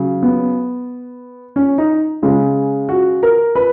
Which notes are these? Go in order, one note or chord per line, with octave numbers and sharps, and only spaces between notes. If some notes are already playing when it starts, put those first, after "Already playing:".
Already playing: C#3 F#3
B3
C#4
D#4
C#3 G#3
F#4
A#4
B4